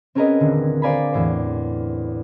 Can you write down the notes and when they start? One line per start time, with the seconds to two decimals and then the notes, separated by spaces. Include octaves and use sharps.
0.15 C4 C#4 G#4 A#4 B4 D#5
0.40 D#1 D3
0.82 C5 D5 F5 G#5 A#5 B5
1.13 E2 A2 C5